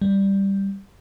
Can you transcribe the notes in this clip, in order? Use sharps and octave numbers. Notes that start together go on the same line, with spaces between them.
G3